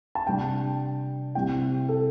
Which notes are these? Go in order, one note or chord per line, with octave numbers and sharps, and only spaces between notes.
A5
C3 G3 D4 G5
C3 G3 C4 E4 G5
A4